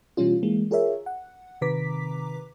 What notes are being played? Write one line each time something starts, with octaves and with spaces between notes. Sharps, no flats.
B2 E3 G3 C#4 F4
E3 G#3 A#3
F4 G#4 A#4 C#5 E5
F#5
C3 D#3 B4 A#5 D6 B6